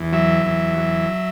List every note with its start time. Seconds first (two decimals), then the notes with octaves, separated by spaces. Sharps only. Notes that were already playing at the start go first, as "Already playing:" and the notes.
Already playing: E2
0.12 F#3 E5
0.46 E2
0.78 F#3